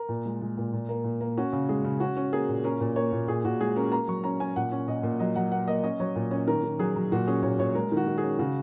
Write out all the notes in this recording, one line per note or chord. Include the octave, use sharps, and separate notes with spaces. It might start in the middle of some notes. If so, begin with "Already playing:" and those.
Already playing: A#4
A#2
G#3
G#3
A#2
A#2
A#3
A#2
A#3
C#4 F#4
C#3
G#3 G#4
C#3
C#4 F#4
C#4
A#3 G#4
A#2
C#4 A#4
A#2
A#3 C#5
A#2
A#2 G#4
A#2 F#4
G#3 G#4
C#4 A#4
A#3 A#5
F#3 C#6
C#4 A#5
C#4 G#5
A#2 F#5
C#4
A#2 D#5
A#2
F#3 D#5
F#3 F#5
A#3 F#5
A#3 D#5
C#4 D#5
F#3 C#5
A#2
C#4 C#5
D#3 A#4
D#3
F#3 G#4
F#3
A#2 F#4
C#4 G#4
A#2 C#5
A#2 C#5
G#3 A#4
D#3
F#4
D#3
G#4
C#4
C#3 F#4